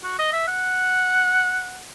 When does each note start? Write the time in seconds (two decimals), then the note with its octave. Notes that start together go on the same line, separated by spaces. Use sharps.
0.03 F#4
0.19 D#5
0.33 E5
0.48 F#5